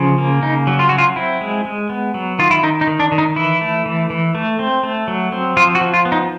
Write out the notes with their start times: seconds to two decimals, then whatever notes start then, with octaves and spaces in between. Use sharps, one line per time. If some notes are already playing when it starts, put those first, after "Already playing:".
Already playing: C#3 F3
0.18 A#3
0.42 C#3 D#4
0.67 F#3
0.79 F4
0.89 F#3 F#4
0.98 F4
1.16 C4 E4
1.41 G#3
1.65 G#3
1.89 B3
2.14 F#3
2.39 D#3 F4
2.51 E4
2.63 D#3 D#4
2.81 D#4
2.87 D#3
3.00 D4
3.12 D#3
3.18 D#4
3.36 E3 E4
3.61 A3
3.86 E3
4.10 E3
4.35 A3
4.59 C4
4.83 A3
5.08 F#3
5.32 C4
5.57 F3 F4
5.75 F#4
5.81 F3
5.94 F4
6.05 B3
6.12 D#4